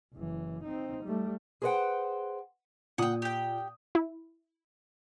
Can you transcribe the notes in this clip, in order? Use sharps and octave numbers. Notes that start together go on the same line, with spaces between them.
F#1 E3
C4 D#4
G3 A3
G#4 B4 C5 D5 F#5 G5
A#2 F#5 G5 D#6
G4 G5
E4